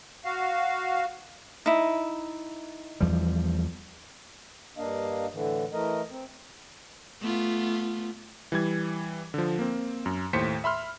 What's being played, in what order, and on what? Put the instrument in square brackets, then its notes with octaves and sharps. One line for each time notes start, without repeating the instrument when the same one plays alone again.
[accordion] F#4 F5
[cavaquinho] D#4 E4
[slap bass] E2 F3 G3
[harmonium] G2 A#3 D4 D#5 F5
A2 D3 E3
E3 A3 A#4 D#5
C4
[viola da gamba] A3 B3 F4
[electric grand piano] E3 G3 G#6
D3 F3
A#3 C4
F#2
D#2 A2 C5 B6 C#7
E5 B5 C6 F6